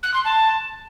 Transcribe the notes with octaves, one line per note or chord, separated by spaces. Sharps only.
F#6
C6
A5